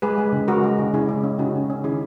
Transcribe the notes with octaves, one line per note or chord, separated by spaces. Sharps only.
G#3 G#4 B4
G#3
C#3
G#3 F#4 A#4
G#3
C#3
C#3 E4 G#4
G#3
C#4
C#3 D#4 F#4
C#3
C#4
D#3 E4 G#4